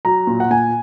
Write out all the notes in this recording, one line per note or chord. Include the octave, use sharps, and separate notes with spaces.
F#3 A#5
A#2
F#5
A#2 G#5